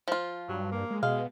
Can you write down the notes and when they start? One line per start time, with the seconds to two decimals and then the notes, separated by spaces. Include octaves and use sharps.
0.08 F3 F4
0.49 G2 F#3
0.72 A#3
0.91 G#3
1.03 B2 G#3 F5